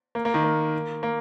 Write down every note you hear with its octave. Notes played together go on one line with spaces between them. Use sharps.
A#3
A#3
D#3
A#3
A#3